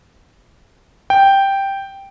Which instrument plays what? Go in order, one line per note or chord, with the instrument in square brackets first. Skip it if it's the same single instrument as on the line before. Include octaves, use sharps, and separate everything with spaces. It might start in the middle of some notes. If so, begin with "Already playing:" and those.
[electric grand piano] G5